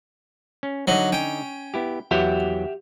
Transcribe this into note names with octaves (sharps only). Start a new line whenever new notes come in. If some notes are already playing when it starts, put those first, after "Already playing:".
C#4
D3 F#3 D#4 D#5
C#4 G5
B3 E4 G4
E2 E3 F#3 G4 E5 F#5